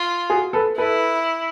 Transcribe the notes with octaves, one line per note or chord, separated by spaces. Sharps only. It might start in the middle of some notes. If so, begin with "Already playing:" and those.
Already playing: F4
F#4 G#4
A4 B4
E4 A4 B4